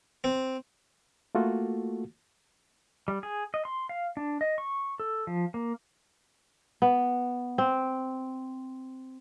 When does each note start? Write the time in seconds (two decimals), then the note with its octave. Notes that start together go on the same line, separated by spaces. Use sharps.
0.24 C4
1.35 A3 A#3 F4 F#4 A4
3.08 G3
3.23 G#4
3.54 D#5
3.65 C6
3.89 F5
4.17 D4
4.41 D#5
4.58 C#6
5.00 A4
5.27 F3
5.54 A#3
6.82 B3
7.58 C4